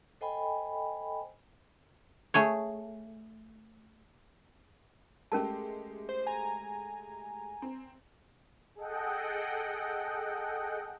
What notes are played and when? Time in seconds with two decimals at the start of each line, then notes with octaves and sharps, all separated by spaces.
0.21 A4 C5 D#5 G5 G#5 B5
2.34 A3 G#4 C#5
5.32 G#3 A3 C#4 G4 A#4 A5
6.09 C5
6.27 G#5 A#5
7.62 C4
8.75 G#4 A4 D#5 F#5 G5